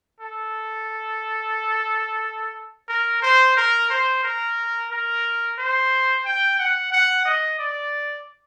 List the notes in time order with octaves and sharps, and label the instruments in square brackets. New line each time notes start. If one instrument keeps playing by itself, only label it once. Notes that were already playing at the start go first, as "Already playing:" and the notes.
[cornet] A4
A#4
C5
A#4
C5
A#4
A#4
C5
G5
F#5
F#5
D#5
D5